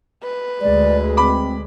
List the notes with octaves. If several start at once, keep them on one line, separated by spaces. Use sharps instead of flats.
B4
D2 G#3 D5
C4 B5 D6